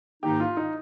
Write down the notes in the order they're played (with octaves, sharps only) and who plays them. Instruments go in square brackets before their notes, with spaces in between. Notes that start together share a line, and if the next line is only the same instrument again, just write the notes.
[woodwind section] G#2 D#3 A#3 D#4 [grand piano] G4
[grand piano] F4
D#4